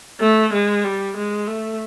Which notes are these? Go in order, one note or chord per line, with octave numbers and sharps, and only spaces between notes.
A3
G#3
G3
G#3
A3